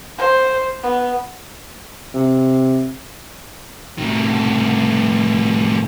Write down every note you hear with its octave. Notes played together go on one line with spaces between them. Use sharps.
C5
B3
C3
A2 D#3